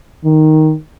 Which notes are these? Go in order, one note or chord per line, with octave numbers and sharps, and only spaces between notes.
D#3